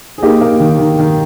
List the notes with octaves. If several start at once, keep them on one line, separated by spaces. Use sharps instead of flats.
G#4
A#3 D#4 G4
A#3
D#3
D#3
D#3